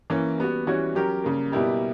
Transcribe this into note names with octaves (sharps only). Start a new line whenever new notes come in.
E3 A#3 C#4
G3 B3 F#4
E3 G3 C#4 F#4 C#5
F#3 C#4 G4 A#4
C#3 G3 A#3
B2 G3 A#3 E4 G4